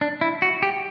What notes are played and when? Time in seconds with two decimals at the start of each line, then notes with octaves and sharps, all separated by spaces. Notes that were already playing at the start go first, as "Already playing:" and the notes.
0.01 D4
0.21 E4
0.42 F#4
0.62 G4